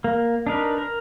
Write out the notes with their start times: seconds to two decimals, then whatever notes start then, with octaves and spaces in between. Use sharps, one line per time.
0.04 A#3
0.47 D4 D#4 A#4 B4
0.78 A#4